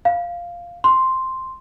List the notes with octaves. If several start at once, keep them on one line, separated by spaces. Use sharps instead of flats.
F5
C6